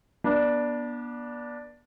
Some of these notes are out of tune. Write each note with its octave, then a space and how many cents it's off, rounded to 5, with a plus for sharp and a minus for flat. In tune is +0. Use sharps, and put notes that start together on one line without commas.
B3 -40 D4 +0